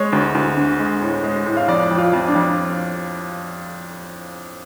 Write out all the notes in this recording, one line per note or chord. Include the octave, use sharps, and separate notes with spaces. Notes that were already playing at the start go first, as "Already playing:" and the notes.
Already playing: G#3 C#5
D2
D2
D3
G#3
A2
G#3
A2
F5
F2 D5
F2
F4
F2
D4
F2